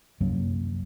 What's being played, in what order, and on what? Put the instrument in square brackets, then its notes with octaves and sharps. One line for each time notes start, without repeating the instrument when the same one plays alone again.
[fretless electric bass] C2 F#2 F#3 A#3